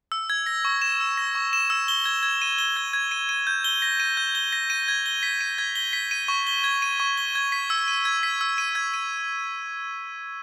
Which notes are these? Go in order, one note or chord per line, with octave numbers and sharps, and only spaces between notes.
E6
G#6
A#6
C#6
E7
E6
A#6
C#6
E7
E6
G7
G#6
G#6
D#7
G7
G#6
G#6
D#7
D#7
G6
G7
A#6
D#7
G6
G7
A#6
D#7
G#6
G7
B6
D#7
G#6
G7
B6
D#7
C#6
G7
G#6
D#7
C#6
G7
G#6
B6
E6
D#7
G#6
B6
E6
D#7
G#6
D#7